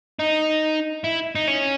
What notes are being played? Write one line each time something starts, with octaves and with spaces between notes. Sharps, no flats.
D#4
E4
D#4
C#4